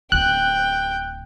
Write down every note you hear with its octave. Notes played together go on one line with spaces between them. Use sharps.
D1 B3 G5 F#6